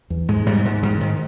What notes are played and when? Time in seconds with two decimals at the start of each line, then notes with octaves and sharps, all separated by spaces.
0.10 E2
0.28 G#2 G#3
0.46 G#2 G3
0.65 G#2
0.83 G#2 D#3
1.01 G#2 D#3